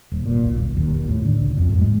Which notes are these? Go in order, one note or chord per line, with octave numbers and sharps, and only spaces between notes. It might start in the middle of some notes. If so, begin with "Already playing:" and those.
D#1
A#2
B1
D#1
D#2
D#2
A2
D3
C#2
F2
G#2
G#3